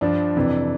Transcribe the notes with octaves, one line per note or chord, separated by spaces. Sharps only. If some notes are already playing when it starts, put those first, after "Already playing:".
G2 F3 D4
F2 C3 E3